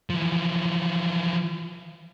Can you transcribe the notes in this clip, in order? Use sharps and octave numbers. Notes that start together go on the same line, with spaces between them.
E3 F3